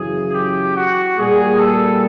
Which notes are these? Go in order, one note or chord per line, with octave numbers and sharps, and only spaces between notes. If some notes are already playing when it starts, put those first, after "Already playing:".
Already playing: F#2 C#3 E3 G#4
G4
F#4
A#2 G3 A#3 G#4
A4